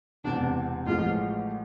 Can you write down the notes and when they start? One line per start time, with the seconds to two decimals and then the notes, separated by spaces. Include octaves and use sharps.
0.24 E1 E2 C3 E3 D4
0.86 A1 A2 F3 G#3 F4